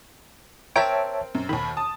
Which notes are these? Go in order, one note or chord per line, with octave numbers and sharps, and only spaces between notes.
C4 A#4 C#5 E5 G5 A5 D7
F#2
D#2 D#3 B5
A5 D#6